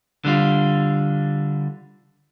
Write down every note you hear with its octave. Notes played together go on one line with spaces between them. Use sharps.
D3 G3 F4